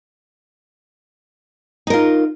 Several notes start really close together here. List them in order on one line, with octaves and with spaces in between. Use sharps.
D#4 A#4 F4